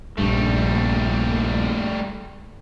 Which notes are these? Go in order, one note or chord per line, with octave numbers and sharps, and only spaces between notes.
A#1 G2 G3 A3